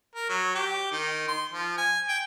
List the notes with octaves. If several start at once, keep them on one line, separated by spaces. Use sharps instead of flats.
A#4
F#3
G4
D#3
C6
F3
G#5
G5